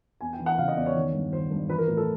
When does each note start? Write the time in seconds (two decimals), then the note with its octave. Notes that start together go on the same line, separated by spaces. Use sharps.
0.21 E2 G#5
0.33 G5
0.39 E3
0.46 F#5
0.58 C#3 F5
0.68 D#5
0.77 E2 D5
0.86 C#5
0.95 D#3
1.13 G2
1.32 D#3 C5
1.50 G2
1.69 E3 B4
1.78 A#4
1.88 A2 B4
1.97 A4